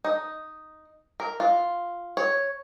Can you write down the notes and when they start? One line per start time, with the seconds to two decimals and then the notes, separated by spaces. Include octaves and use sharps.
0.05 D#4
1.20 A#4
1.40 F4
2.17 C#5